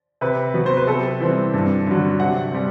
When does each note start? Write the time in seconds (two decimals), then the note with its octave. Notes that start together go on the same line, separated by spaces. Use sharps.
0.21 C3 B4
0.54 F#3 B3
0.66 C5
0.77 B4
0.87 C3 A4
1.20 E3 G3 C4
1.54 G2
1.86 D3 F#3
2.20 C3 F#5
2.52 G3 C4